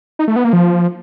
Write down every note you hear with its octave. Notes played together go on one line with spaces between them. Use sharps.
D#4
A3
B3
A#3
F3